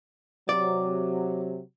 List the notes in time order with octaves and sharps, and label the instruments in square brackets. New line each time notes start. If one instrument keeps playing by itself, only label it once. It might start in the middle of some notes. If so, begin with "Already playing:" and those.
[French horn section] C3 F#3 [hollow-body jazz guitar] D5